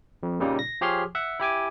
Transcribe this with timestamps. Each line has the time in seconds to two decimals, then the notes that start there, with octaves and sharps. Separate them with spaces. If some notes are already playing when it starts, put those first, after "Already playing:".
0.23 F2
0.40 A#2 C#3 G3 A#3 D#4
0.59 A#6
0.81 F3 G4 G#4 C#5 C6 F6
1.15 E5 F#5
1.40 E4 G4 G#5 D6